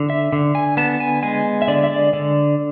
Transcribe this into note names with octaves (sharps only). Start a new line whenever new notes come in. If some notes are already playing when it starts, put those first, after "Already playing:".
Already playing: D3
E5
D3
G#5
B3 A5
G#5
G#3 G#5
E5
D3 D5
E5
D5
D3 D5